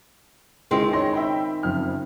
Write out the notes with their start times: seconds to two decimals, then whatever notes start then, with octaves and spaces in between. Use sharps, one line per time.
0.71 C#2 D#3 G#3 C4 E4
0.93 C#5 C6 A#6
1.13 E5 G5 B5
1.63 F#1 F2 F6